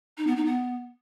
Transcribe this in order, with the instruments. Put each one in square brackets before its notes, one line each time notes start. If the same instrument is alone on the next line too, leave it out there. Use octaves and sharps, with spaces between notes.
[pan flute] D#4
B3
D#4
B3